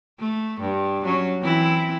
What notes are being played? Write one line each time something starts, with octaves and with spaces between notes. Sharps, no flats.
A3
G2
F#3 C#4
E3 C4 E4